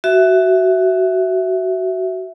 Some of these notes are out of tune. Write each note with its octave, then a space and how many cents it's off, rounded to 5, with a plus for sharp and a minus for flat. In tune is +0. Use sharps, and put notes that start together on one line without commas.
F#4 +15 E5 +0